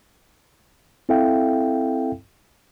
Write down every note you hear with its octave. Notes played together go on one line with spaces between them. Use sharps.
C4 E4 A4 E5 F5 G5